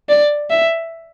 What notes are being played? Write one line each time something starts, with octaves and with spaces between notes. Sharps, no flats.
D5
E5